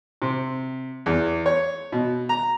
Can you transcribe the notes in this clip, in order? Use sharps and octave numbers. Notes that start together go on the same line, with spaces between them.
C3
E2
C#5
B2
A#5